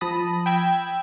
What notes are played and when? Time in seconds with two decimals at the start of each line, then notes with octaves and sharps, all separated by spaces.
0.01 F3 A5 B5 D#6 A#6
0.46 G5 B5 E6 G#6